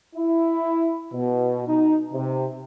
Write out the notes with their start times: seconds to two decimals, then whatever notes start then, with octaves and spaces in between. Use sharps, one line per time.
0.16 E4
1.13 B2
1.67 D#4
2.13 C3